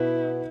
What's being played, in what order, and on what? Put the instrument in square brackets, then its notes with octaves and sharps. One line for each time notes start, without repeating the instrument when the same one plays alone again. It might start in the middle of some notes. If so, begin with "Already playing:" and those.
Already playing: [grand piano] B2 B3 F#4 B4 [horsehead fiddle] E4